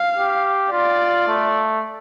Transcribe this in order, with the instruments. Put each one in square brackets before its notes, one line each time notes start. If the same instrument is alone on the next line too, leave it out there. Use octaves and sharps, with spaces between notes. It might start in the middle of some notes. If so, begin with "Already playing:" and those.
Already playing: [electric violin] F5
[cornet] G4
[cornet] F4 [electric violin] D5
[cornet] A3